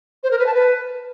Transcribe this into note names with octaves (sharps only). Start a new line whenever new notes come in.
C5
A#4
B4
A5
B4